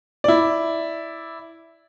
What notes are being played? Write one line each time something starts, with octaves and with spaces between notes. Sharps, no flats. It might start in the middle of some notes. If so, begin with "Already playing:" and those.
E4 D5